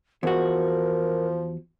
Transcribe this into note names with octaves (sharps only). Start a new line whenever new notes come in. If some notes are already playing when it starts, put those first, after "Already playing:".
E2 F3 F#4 A#4